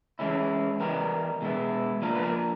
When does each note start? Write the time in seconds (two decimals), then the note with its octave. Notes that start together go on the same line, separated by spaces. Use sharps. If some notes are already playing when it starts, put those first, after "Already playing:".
0.19 E3 G#3 C#4 E4
0.80 E3 G3 B3 A#4
1.42 B2 G#3 B3 E4
2.02 F3 A#3 D4 A#4
2.15 B4
2.23 A#4